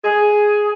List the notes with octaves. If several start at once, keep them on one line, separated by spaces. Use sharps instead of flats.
G#4